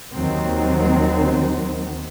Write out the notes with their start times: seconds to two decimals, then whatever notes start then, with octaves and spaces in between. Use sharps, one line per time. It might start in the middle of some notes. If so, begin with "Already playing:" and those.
0.15 D#2 D#3 F#3 C4